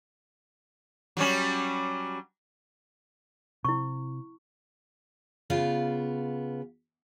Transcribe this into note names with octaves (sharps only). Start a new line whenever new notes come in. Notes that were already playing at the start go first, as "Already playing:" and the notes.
F#3 G3 C#4
C3 E4 C#6
C#3 B3 F4 F5